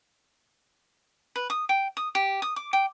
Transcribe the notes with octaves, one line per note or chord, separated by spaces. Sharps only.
B4
D#6
G5
D#6
G4
D#6
D6
G5